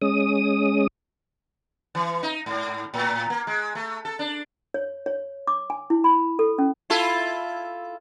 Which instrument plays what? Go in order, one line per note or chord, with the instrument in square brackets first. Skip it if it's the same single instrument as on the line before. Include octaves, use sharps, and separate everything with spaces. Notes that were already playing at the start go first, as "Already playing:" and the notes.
[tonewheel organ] G#3 C#4 D#6
[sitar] E3
D#4
G#2
A2
A#3
G#3
A3
A4
D4
[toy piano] C#5
C#5
D6
G#5
E4
B5
A4
C#4
[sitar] E4 F4 A4